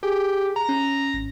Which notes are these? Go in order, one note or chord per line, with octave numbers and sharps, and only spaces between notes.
G4 G#4
A#5
C#4
G#1